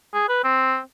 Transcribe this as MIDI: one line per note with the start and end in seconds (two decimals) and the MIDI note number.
0.14 0.28 68
0.29 0.40 71
0.44 0.79 60